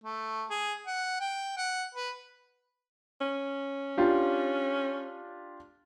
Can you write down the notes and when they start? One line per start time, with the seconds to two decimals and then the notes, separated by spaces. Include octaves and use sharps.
0.04 A3
0.50 G#4
0.87 F#5
1.20 G5
1.57 F#5
1.95 B4
3.21 C#4
3.98 D4 F4 G4